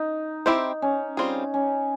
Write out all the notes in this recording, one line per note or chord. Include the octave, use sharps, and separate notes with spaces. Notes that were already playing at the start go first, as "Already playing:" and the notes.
Already playing: D#4
C4 E4 G4 C5
C#4
G3 C4 F4 G#4
C#4